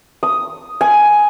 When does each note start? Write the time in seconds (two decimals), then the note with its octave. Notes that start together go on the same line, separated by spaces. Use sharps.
0.23 D#6
0.81 G#5